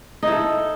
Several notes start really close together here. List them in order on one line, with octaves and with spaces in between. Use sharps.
D#4 E4 A4